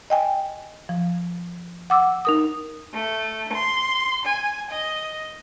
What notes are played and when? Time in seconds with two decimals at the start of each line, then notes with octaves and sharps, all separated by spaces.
0.10 D#5 G5 G#5
0.89 F3
1.90 F#5 D6 E6
2.25 D#4 A#4 D#6
2.93 A3
3.53 C6
4.25 G#5
4.70 D#5